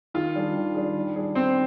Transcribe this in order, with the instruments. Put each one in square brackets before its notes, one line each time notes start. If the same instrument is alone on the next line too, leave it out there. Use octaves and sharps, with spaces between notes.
[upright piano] D#3 [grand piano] F4
[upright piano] G3 D4 G#4
D#3
G3 D4 G#4
D#3
G3 D4 G#4
[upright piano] D#3 [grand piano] C4